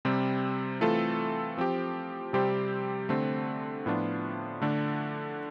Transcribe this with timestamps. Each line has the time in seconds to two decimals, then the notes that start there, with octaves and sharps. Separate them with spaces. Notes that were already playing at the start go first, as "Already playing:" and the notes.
0.05 C3 G3 C4
0.81 E3 A3 C4 F4 A4
1.58 F3 C4 G4
2.33 C3 G3 C4 G4 C5
3.09 D3 A3 C4
3.86 A2 F3 B3 D4 F4
4.62 D3 A3 D4